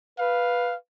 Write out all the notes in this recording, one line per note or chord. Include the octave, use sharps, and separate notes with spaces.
B4 F5